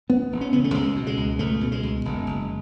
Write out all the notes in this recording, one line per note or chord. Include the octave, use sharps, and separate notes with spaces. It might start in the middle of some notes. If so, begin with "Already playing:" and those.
E1 B3
E1
C#4
C#3 B3
A3
C#2 G#3
B2
G#3
C#2
C#2 A3
B2
G#3
C#2
F#1
F#1